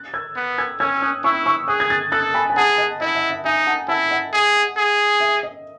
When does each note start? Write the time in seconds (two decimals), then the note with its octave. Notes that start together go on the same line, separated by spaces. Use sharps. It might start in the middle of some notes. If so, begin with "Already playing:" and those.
Already playing: F#6 A6
0.14 E6 G#6
0.36 B3
0.58 E6 G#6
0.80 C#4 E6 G#6
1.02 D#6 F#6
1.24 E4 C#6 E6
1.46 C#6 E6
1.68 G#4 D#6 F#6
1.80 G#6
1.90 F#6 A6
2.12 A4 F#6 A6
2.34 G#5 B5
2.50 G#5
2.56 G#4 F#5 A5
2.78 D#5
3.01 E4 D#5
3.15 E5
3.31 E5
3.45 D#4 E5 G#5
3.67 F#5 A5
3.88 E4 F#5 A5
4.11 D#5 F#5
4.33 G#4
4.77 G#4
5.20 E5
5.43 D#5